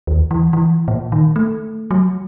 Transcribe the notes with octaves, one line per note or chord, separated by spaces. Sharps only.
D#2
E3
E3
A#2
D#3
A3
F#3